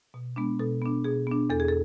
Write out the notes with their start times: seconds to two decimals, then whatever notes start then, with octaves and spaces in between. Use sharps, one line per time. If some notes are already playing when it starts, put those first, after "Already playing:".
0.14 B2
0.36 G#3 B3 D4
0.59 B2 A4
0.82 B3 D4
1.04 B2 G#4
1.27 B3 D4
1.50 E2 A4
1.60 G#4
1.68 A4